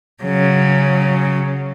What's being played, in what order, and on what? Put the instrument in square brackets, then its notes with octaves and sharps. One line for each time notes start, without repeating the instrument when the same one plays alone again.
[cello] C#3 F#3